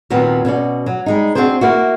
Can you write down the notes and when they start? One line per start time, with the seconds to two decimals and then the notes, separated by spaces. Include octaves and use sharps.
0.10 D#2 A#2 F#3 B3 C4
0.45 B2 C#4 F#4 D5
0.86 F#3
1.06 G3 G#3 D#4
1.35 C4 D4 F#4 G#4 C5
1.61 A#3 E4 F#4